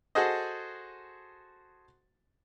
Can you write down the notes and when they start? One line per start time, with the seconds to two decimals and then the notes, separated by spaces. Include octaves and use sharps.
0.15 F#4 G#4 A4 C5 D#5